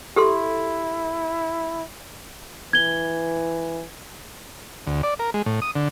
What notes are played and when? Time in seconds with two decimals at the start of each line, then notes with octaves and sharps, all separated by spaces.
0.16 E4 G4 A4 C6
2.73 E3 G#6 G7
4.87 D2
5.03 D5
5.19 A#4
5.34 G#3
5.46 A2
5.62 D#6
5.76 D3